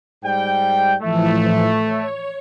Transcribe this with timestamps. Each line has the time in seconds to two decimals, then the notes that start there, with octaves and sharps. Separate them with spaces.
0.24 G#2 G3 G5
1.01 A2 E3 F3 A3
1.85 C#5